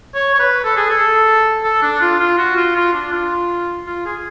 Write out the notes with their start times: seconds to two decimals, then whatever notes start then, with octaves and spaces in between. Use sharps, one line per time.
0.14 C#5
0.35 C#5
0.40 B4
0.64 A4
0.77 G#4
0.90 A4
1.64 A4
1.82 D4
2.01 F4
2.19 F4
2.38 F#4
2.56 F4
2.76 F4
2.93 D4
3.12 F4
3.87 F4
4.06 G#4